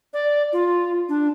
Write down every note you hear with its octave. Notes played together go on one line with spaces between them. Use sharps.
D5
F4
D4